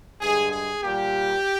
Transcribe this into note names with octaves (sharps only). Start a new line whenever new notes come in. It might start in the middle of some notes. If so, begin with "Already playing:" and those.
G2 D3 G#3 G#4
G#4
A#2 G3 A#3 G4